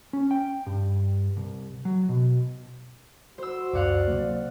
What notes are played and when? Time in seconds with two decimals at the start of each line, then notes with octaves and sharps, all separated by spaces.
0.13 C#4
0.31 G5
0.67 G2
1.37 C2
1.85 F#3
2.09 B2
3.38 F#4 C5 E6
3.73 C#2 F#2 D5 F5 F#5 D6
4.08 C3 F#3 A#3